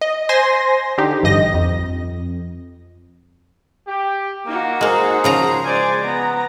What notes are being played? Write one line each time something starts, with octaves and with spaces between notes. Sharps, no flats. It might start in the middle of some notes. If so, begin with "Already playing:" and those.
D#5
C5 G#5 C6 A#6
D3 D#4 G4
A1 G2 D#5 A#6
F2
G4
A#3 D#4 F#4
G#3 A#3 G#4 C5
C#3 F3 A#5
G#3 C5 D5 G#5
B3 A#5